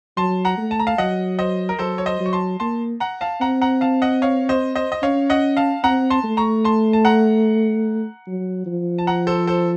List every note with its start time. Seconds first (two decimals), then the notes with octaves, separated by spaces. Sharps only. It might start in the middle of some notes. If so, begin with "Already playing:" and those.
0.17 F#3 A5 C6
0.45 F#5 A#5
0.58 A3
0.71 A5
0.80 A#5
0.87 F5 A5
0.98 F#3 D#5 F#5
1.39 C5 D#5
1.69 A#4
1.79 F#3 A4 C5
1.98 C#5
2.06 C5 D#5
2.20 F#3
2.26 C#6
2.33 A5 C6
2.60 A#3 A5 C6
3.00 F#5 A#5
3.21 F5 A5
3.41 C4 F#5 A#5
3.61 F#5 A#5
3.81 F5 A5
4.02 D#5 F#5
4.22 C#5 F5
4.49 C5 D#5
4.75 C5 D#5
4.92 D#5
5.02 C#4 C#5 F5
5.30 D#5 F#5
5.57 F5 A5
5.84 C4 F#5 A#5
6.10 A5 C6
6.24 A3
6.37 A#5 C#6
6.64 A5 C6
6.93 A5
7.05 F#5 A#5
8.27 F#3
8.66 F3
8.98 A5
9.07 F#5 A#5
9.27 A4 C5
9.47 A4 C5